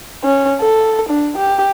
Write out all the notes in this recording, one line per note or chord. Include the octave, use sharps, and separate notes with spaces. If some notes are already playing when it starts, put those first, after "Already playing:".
C#4
A4
D4
G4